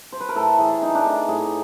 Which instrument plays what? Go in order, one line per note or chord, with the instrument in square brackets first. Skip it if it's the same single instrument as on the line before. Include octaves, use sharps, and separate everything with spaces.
[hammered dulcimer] C5
B4
A#4
A2 A4
E3 G#4
D4 D#4
D4
A3 D#4
A2 G#4